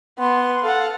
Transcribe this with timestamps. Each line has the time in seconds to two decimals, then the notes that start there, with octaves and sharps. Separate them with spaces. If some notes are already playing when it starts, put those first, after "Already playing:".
0.19 B3 C6
0.63 A4 F5 F#5